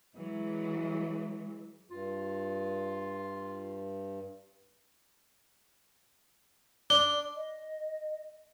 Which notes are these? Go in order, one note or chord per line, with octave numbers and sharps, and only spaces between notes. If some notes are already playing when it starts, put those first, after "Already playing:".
E3 F#3 G#3
G2 F4
D4 G7
D#5